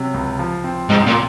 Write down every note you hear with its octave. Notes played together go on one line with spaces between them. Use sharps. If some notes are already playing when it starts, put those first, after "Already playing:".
Already playing: C3 F#3 C#4
C#2
F3
C4
G#2 C3
A#2